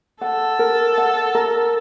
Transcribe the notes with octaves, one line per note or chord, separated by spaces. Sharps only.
A4 F#5
A#4
F#5
A#4